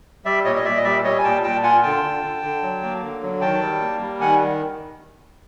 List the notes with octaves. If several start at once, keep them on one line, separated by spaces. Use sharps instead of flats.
G3 D5 E5
A#2 C#5 D#5
D#5
A#2 D5 E5
D#5
G3 D5 E5
G3 C#5 D#5
G#5
A#2 G5 A5
A#2 G5 A5
F4 F#5 G#5
D3 G5 A5
D3
D3
D3
F#3
A#3
D3
F#3
D#3 G5 A5
G3
A#3
G3
D#3 F#5 G#5